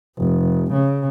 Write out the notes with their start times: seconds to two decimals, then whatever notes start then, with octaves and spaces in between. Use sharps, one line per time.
0.18 F1
0.73 C#3